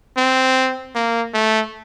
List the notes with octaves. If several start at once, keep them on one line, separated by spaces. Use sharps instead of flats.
C4
A#3
A3